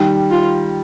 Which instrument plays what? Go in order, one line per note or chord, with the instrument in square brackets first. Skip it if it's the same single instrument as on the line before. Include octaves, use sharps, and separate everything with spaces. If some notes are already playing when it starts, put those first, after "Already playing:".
Already playing: [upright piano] D#3 G3
[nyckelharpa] F4